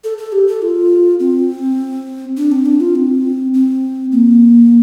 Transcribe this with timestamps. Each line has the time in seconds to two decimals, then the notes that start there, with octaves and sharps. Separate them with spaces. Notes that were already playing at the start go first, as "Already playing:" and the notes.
0.04 A4
0.18 A4
0.32 G4
0.47 A4
0.62 F4
1.20 C4
2.37 D4
2.52 C4
2.66 D4
2.80 F4
2.95 C4
3.54 C4
4.12 A#3